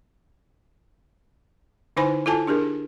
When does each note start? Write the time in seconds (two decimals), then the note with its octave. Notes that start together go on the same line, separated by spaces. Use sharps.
1.97 D3 D#4 E4 C5 G#5 B5
2.26 E4 F4 A4 G#5 A5
2.47 D4 G4 G#4 A#4